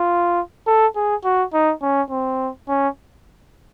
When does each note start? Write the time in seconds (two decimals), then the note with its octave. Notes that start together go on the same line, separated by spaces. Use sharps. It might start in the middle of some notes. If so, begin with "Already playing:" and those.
Already playing: F4
0.67 A4
0.96 G#4
1.24 F#4
1.53 D#4
1.82 C#4
2.10 C4
2.68 C#4